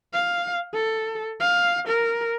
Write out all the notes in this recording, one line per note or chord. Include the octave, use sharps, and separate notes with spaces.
F5
A4
F5
A#4